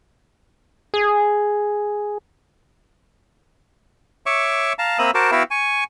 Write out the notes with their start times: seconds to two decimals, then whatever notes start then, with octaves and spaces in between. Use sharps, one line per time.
0.94 G#4
4.26 C#5 E5 C#6 D6
4.79 F5 A5 A#5
4.99 A#3 C4 E5 A#5 B5 D#6
5.14 F#4 A#4 C5 A5 D6
5.32 B3 E4 F#4 E5 F5 G5
5.51 G#5 C#6